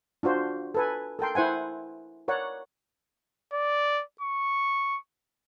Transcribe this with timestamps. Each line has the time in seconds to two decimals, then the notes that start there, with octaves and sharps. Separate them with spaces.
0.23 D4 F4 F#4 C5
0.75 A4 B4 G#5
1.19 A4 A#4 G5 C6
1.35 E4 C5 F#5 G#5
2.28 A#4 C#5 D5 F#5
3.53 D5
4.21 C#6